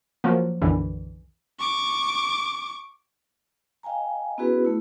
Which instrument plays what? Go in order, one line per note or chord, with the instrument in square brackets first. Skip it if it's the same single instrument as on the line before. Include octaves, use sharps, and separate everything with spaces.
[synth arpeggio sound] F3 F#3 A#3
B1 F#2 D3 E3
[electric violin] C#6 D6
[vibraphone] D#5 F5 G5 G#5 A#5
B3 C#4 E4 F#4 G#4 B4
A3 E4